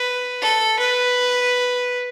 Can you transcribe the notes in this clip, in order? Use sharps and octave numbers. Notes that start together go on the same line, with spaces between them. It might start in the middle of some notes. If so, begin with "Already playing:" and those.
Already playing: B4
A4
B4